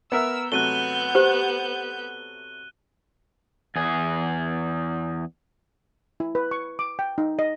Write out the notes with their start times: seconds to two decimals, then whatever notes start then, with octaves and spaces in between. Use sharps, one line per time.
0.12 B3 A#4 E5 E6
0.52 C3 F#3 A3 B3 F#6 G6 D#7 G7
1.15 G4 C5
3.76 E2 G#4
6.20 E4
6.35 B4
6.51 C#6
6.79 D6
6.99 G5
7.18 D#4
7.39 D#5